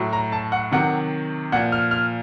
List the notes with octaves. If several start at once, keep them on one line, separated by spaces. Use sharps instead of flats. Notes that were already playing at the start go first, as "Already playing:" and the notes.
Already playing: A2 F#3
A#5
A5
F#5
C3 D#3 F#3 F#5
A#2 F3 F#5
F6
F6